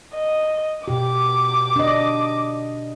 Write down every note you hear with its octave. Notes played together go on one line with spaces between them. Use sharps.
D#5
B2 G4 D6
D4 D#5